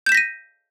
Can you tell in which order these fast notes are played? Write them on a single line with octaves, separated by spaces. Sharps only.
G6 E7 B6 A#6 D#7